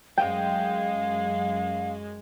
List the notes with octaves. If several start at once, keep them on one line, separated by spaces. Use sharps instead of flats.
F#2 G#3 F5 G5